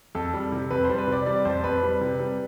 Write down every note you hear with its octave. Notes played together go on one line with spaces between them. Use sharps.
F2 A4
G3
C3
F2 B4
C5
G3
B4
C3 D5
G3 D5
F2 C5
F2 B4
G3
C3
G3